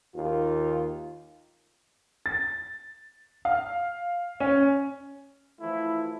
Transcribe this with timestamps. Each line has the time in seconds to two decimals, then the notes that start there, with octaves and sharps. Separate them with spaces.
0.15 D#2 F4
2.26 A6
3.45 F5
4.40 C#4
5.61 E3 F3 A3 E4